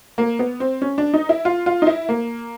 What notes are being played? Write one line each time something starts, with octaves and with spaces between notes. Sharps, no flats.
A#3
B3
C4
C#4
D4
D#4
E4
F4
F4
D#4
E4
A#3